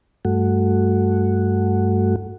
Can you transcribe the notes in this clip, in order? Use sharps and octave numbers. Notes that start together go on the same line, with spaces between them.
G2 A3 F#4